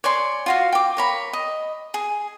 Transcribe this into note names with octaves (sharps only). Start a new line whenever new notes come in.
C#5 D5 G#5 C6
F4 F#4 F5
G5 D6
A#4 C#5 B5
D#5
G#4